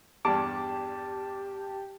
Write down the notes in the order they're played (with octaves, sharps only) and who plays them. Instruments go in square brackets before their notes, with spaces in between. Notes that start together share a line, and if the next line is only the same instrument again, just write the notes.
[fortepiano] E2 G2 G3 [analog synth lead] G4 [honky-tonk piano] A5 [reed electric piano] D6